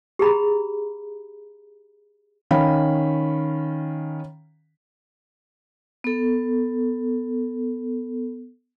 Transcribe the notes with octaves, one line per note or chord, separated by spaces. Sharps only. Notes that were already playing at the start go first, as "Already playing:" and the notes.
G4 G#4 A#5 B5
D#3 C#4 F5 B5
B3 A4